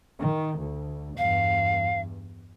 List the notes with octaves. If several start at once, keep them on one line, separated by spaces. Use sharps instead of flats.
D#3
D2
E2 G2 F5